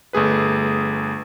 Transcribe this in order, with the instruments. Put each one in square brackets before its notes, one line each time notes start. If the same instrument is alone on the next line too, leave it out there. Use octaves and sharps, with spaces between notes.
[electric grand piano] G1 A3 G#4 B4